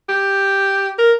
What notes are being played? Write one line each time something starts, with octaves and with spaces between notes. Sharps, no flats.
G4
A#4